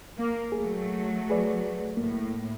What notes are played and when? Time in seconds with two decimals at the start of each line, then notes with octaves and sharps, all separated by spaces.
0.18 A#3
0.52 F#3 A3 G#4
1.30 G#4 B4 D5
1.97 A2 A#3